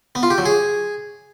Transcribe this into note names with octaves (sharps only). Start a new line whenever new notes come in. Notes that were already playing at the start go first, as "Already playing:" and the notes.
B3
F4
G4
F#3
G#4